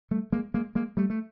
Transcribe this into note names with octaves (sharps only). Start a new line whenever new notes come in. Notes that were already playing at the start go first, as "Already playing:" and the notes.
G3 A3
G#3 A#3
G#3 A#3
G#3 A#3
G3 A3
A3